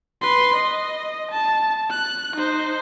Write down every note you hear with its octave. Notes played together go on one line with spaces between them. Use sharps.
B4 C6
D#5
A5
F#6
D#4 C5